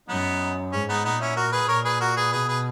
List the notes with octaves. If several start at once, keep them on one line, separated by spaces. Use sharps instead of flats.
F#2 B3 D#4
G#2 C#4
B3 D#4
A#2 B3 D#4
C#4 E4
F#4 A#4
G#4 B4
A#2 A#4 C#5
G#4 B4
F#4 A#4
G#4 B4
B2 G#4 B4
G#4 B4